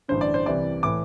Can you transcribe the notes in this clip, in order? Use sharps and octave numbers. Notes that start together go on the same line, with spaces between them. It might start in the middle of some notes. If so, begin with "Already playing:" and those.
A1 G2 D3 C5
D5
C5
C2 C3 E3 D5
A2 E3 D6